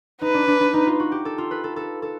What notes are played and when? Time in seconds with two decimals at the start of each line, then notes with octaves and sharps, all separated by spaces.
0.21 D#4 B4
0.34 D4
0.48 D4
0.60 D4
0.74 D#4
0.87 F4
1.00 F#4
1.12 G4
1.25 A4
1.38 F4
1.51 B4
1.64 A4
1.76 A4
2.02 A4